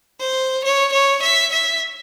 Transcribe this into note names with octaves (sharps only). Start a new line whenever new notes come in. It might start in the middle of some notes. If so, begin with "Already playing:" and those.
C5
C#5
C#5
E5
E5